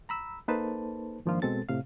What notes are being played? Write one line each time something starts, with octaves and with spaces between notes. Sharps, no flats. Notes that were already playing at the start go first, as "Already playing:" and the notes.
A#5 B5 E6
A#3 D#4 A4 B4 C5 A5
G#2 D#3 F3 A#3 D4 F4
B2 G#3 C4 A4 A6
A2 C3 F5